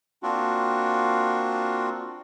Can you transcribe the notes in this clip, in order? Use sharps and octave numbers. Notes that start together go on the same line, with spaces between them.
A#3 C4 D4 F4 F#4